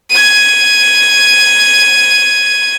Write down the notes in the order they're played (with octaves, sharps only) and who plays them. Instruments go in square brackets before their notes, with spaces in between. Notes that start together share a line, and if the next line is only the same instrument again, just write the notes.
[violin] G#6 D#7